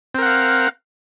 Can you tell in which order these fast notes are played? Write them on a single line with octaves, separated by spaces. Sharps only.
C4 A#4 F#5 F5